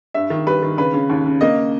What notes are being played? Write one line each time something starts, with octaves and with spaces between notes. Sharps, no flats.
G2 E5
D#3
G3 B4
D#3
C#3 B4
C#3
D#2
C#3
A#3 D#5